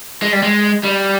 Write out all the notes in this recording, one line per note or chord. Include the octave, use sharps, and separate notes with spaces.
G#3
G3
G#3
G3